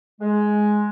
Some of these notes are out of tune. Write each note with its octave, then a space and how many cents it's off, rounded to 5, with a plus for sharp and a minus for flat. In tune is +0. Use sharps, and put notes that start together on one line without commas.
G#3 +10